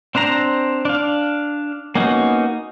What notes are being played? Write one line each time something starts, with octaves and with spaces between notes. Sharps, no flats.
C4 D4 C5 A#5
D4 F5
A#3 B3 C#4 D#4 F#4